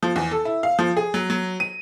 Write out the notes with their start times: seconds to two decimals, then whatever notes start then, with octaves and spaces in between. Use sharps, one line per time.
0.03 F3
0.16 E2
0.31 A4
0.45 E4
0.63 F5
0.79 F3
0.97 G#4
1.14 F#3
1.30 F#3
1.60 D#7